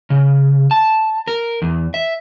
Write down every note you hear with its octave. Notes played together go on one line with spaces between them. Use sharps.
C#3
A5
A#4
E2
E5